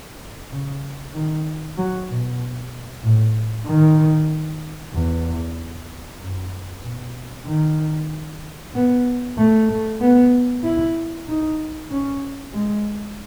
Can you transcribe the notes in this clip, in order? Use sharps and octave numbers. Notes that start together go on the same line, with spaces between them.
C#3
D#3
F#3
B2
A2
D#3
E2
F#2
B2
D#3
B3
A3
A3
B3
E4
D#4
C#4
G#3